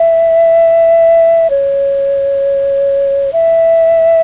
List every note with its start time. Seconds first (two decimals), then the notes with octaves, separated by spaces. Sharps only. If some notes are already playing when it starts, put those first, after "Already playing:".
Already playing: E5
1.50 C#5
3.33 E5